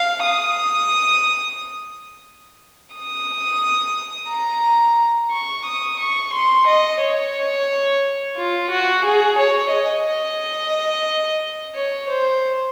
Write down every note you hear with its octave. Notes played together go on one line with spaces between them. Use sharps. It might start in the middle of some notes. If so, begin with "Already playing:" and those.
Already playing: F5
D#6
D#6
A#5
C#6
D#6
C#6
C6
D#5
C#5
F4
F#4
G#4
C#5
D#5
C#5
C5